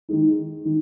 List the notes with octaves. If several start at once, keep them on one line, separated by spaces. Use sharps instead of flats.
D#3 G#3 D#4
D#3